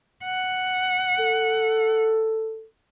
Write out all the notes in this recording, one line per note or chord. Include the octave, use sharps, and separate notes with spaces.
F#5
A4